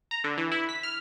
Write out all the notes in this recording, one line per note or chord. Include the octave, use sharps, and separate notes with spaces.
A#5
D3
E3
E4
B6
F6